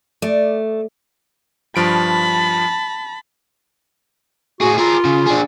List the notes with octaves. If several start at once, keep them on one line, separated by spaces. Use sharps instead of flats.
A3 D5
G2 F3 A5 B5 D7
A2 F#4 G#4
F4 G#4 A#4
C#3
D4 G#4